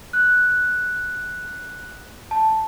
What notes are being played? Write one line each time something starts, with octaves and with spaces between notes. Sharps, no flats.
F#6
A5